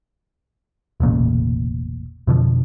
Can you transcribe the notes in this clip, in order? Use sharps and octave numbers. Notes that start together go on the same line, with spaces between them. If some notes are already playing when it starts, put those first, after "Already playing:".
E1 A1 A#2 C#3
F2 B2 D3 F3